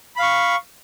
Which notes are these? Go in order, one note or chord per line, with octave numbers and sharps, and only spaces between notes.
F5 B5 C#6